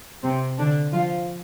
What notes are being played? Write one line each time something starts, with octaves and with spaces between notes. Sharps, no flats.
C3 C4
D3 D4
F3 F4